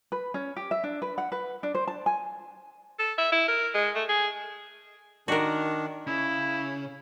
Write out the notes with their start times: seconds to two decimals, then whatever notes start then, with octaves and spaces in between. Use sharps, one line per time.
0.12 B4
0.34 C#4
0.56 G4
0.71 E5
0.84 D4
1.02 B4
1.18 F#5
1.32 B4
1.63 D4
1.75 C5
1.87 A5
2.06 G#5
2.99 A4
3.18 E5
3.32 E4
3.48 A#4
3.74 G#3
3.96 A3
4.09 G#4
5.28 D#3 D4 F#4 A#4
6.07 C#3 E4